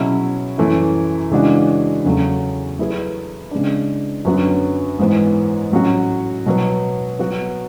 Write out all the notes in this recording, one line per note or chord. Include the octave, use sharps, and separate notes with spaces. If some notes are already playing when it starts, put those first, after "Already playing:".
Already playing: B2 F#3 C#4 E4 G#4
F#2 E3 A3 E4
C#3 E3 G#3 D4 F#4
E2 C#3 F#3 A3
F#3 A3 E4 G#4 B4
C#3 G#3 D4
F#2 D3 F#3 B3 F#4
G#2 E3 B3
A2 F#3 C#4 F#4
B2 F#3 B3
F#3 B3 F#4